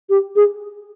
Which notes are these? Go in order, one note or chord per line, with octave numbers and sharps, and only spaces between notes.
G4
G#4